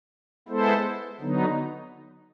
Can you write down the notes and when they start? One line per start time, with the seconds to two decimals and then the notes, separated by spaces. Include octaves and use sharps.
0.48 G#3 B3 E4 A4 C5
1.20 D3 F#3 B3 D#4